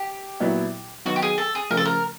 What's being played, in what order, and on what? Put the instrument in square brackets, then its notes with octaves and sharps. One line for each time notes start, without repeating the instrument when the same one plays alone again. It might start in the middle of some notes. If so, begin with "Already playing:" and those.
Already playing: [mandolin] G4
[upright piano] A#2 F#3 B3 E4
[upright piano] D#3 F#3 B3 D#4 [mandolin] F#4
[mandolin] G4
G#4
A4
G#4
[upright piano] C#3 F3 A3 [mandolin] A#4
[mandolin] A4
A#4